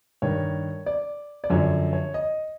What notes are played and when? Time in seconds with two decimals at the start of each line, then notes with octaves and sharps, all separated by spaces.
0.22 G2 D#3 C#5
0.86 D5
1.44 D5
1.50 F#2 D3 F3 C#5
1.93 C#5
2.14 D#5